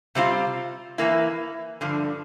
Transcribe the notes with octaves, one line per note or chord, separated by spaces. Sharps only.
C3 G3 C4 F4
E3 A#3 E4
G2 D3 F3